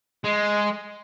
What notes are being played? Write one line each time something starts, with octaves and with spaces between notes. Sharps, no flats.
G#3